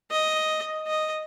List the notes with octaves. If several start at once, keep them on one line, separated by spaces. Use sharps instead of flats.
D#5
D#5